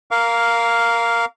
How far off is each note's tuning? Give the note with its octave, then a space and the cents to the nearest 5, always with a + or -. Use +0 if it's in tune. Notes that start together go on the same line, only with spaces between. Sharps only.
A#4 +0 F5 +0 D6 -35